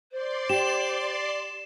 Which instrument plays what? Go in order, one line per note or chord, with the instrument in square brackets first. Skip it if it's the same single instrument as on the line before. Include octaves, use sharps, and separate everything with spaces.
[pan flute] C5 [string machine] D5 C6
[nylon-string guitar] G4 [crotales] E7